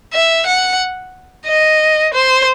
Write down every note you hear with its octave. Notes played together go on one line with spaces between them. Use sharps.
E5
F#5
D#5
C5